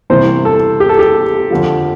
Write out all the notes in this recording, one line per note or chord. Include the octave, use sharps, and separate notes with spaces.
C2 C3 E3 C5
A4
G4
A4
G4
F2 D3 F3